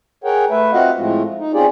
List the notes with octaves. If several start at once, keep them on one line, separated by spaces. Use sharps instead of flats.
G#4 A#4 C#5 F#5 G5
A3 B4 E5
C4 F4 F#4 D#5 F5 F#5
A2 F3 G#3 A3 C4 F4
D#4
C4 C#4 F4 G4 G#4 D5